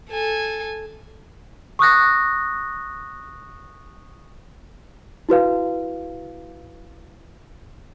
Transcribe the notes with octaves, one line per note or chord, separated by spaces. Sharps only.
A4 G#5
C#6 D#6 F#6 A#6
E4 F#4 B4 F5